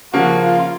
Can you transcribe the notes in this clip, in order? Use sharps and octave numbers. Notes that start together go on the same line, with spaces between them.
C#3 F3 A#3 F#4
F4